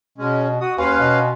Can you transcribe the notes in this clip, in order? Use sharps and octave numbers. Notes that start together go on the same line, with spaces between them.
B2 G#3 C#4
F#4 D#6
D#2 C#4 B4 F5 G#5 C6 C#6
B2